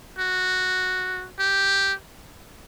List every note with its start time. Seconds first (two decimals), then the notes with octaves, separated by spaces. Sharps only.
0.19 F#4
1.39 G4